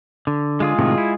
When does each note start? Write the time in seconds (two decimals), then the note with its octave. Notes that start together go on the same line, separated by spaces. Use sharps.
0.27 D3
0.60 G#3 F4 G#4
0.79 A2 C3 D#3
0.98 E4